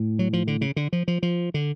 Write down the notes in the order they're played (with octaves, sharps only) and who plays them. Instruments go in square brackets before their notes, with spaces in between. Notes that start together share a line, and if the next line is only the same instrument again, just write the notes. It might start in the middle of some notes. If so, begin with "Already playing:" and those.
Already playing: [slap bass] A2
F#3
F3
D3
C#3
D3
F3
F3
F3
D3